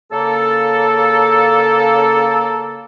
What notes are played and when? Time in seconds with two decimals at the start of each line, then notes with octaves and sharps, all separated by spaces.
0.12 C#3 A#3 A4